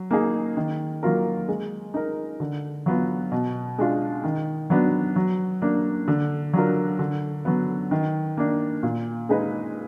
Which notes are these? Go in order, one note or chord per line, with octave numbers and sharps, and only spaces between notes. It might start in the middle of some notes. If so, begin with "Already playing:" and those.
Already playing: F#3
A#3 D#4 G#4
D#3
F#3 A#3 F4 A#4
G#3
D#4 A#4
D3
F#3 B3 F4
B2
G#3 D4 F4
D#3
F#3 B3 D4
F#3
A#3 D4
D3
F#3 D4 F4 A#4
D3
F#3 B3
D#3
A#3 D4
A#2
G#3 D#4 G#4 B4